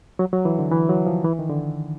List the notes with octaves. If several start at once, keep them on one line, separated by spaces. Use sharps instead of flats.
F#3
F#3
E3
D3
E3
F#3
F3
E3
D#3
D3